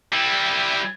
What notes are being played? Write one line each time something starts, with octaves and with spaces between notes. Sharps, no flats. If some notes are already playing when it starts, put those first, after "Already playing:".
G3 E4